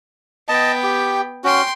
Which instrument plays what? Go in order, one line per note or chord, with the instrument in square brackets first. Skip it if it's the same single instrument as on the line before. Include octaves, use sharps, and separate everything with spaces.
[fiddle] B3 G5 [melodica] D#5 A5
[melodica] G4
[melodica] C#4 F#4 [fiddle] G5 C6